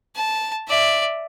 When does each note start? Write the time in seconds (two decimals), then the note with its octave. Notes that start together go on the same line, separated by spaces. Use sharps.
0.15 A5
0.68 D5 E5